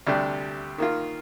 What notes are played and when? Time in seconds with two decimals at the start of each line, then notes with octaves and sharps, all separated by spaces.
0.07 D2 C3 G3 D4 G4
0.78 D#3 A#3 F4